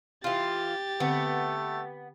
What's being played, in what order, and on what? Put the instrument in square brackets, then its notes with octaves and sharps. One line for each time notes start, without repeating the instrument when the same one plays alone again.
[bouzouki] E3 F4 [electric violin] G4 A6
[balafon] D3 C4 G5 [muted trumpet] A3 [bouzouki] B3